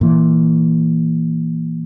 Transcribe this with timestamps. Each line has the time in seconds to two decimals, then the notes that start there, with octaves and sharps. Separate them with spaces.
0.01 A#2 E3